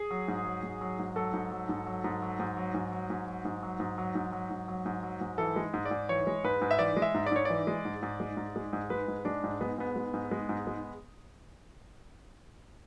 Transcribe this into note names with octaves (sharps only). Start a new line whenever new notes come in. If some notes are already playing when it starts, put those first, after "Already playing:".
Already playing: G#4
F#3
G#2
F#3
G#2
F#3
G#2
F#3 A4
G#2
F#3
G#2
F#3
G#2
F#3
G#2
F#3
G#2
F#3
G#2
F#3
G#2
F#3
G#2
F#3
G#2
F#3
G#2
F#3
G#2
F#3
G#2
E3 A4
G#3
G#2
D5
G#2
E3 C#5
G#3
G#2 B4
G#2
E5
E3 D5
G#3
E5
G#2
D5
G#2 C#5
E3 D5
G#3
G#2
G#2
G#3
G#2
G#3
G#2
G#3 B4
G#2
G#3 D4
G#2
G#3 B3
G#2 B3
G#3
G#2
G#3
G#2
G#3